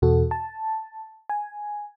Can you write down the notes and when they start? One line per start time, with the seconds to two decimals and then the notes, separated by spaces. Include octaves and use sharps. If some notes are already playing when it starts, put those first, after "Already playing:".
0.02 E2 B2 F#4 A4
0.31 A5
1.30 G#5